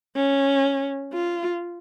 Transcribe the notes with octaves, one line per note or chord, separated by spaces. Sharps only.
C#4
F4